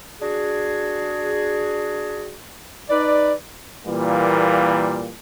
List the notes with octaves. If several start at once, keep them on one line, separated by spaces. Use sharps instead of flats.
D4 F#4 G#4
D#4 B4 D5
A#2 E3 G3 A#3